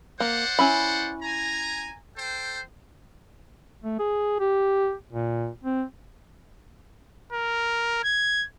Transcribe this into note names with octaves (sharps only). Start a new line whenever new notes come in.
A#3 C5 D5 F#5
C#4 E4 B5
G#5 A#5
A4 C5 G5
A3
G#4
G4
A#2
C4
A#4
G#6